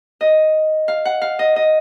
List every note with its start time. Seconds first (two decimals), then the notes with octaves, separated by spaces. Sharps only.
0.21 D#5
0.88 F5
1.05 F#5
1.22 F5
1.39 D#5
1.56 D#5